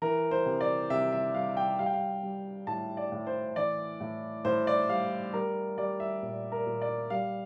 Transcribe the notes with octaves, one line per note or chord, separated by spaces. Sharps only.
E3 A#4
C5
C3
D5
C3 E5
E5
G3 F5
G5
G3 F5
G5
F5
G3
A2 A5
D5
A2
C5
E3 D5
A2
A2 C5
D5
G3 F5
G3 A#4
G3 D5
E5
A#2
A#4
A#2
D5
G3 F5